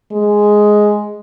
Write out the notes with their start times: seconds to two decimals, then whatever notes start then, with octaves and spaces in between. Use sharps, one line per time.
0.11 G#3